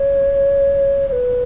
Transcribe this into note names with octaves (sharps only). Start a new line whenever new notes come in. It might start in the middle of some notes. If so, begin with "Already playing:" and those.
Already playing: C#5
C#5
B4